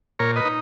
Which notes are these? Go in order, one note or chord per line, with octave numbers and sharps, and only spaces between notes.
A#2 A#4 C#5
B4 D#5
D#4